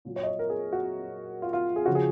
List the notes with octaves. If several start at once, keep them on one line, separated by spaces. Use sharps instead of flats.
A#2 F#3
C#5
D#5
C#5
A#4
G#4
F#4
F4
F4
G#4
C#3 F3 F#4
G#4